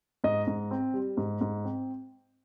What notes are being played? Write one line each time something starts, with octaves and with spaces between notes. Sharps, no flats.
G#2 D#5
G#2
C4
G3
G#2
G#2
C4